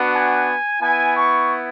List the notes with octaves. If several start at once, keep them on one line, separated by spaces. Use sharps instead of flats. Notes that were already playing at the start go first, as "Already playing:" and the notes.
Already playing: B3 D4 F#4
G#5
B3 E4 G#5
C#6